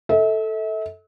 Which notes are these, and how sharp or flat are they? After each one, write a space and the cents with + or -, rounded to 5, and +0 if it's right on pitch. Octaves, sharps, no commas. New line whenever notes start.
A4 +0 E5 -40